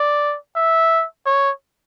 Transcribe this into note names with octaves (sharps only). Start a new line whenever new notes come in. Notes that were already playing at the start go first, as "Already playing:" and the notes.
Already playing: D5
E5
C#5